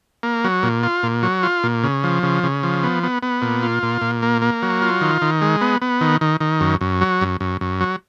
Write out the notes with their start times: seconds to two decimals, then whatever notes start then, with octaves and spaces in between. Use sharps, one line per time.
0.23 A#3
0.44 F#3
0.63 A#2
0.83 F4
1.03 A#2
1.23 F#3
1.43 F4
1.63 A#2
1.83 C#3
2.04 F3
2.23 C#3
2.44 C#3
2.63 F3
2.83 B3
3.03 B3
3.23 B3
3.42 A#2
3.63 F4
3.83 A#2
4.02 A#2
4.22 A#3
4.42 A#3
4.63 F#3
4.82 F4
5.01 D#3
5.22 D#3
5.42 G#3
5.61 B3
5.82 B3
6.01 D#3
6.21 D#3
6.41 D#3
6.61 F#2
6.81 F#2
7.01 F#3
7.21 F#2
7.41 F#2
7.61 F#2
7.81 F#3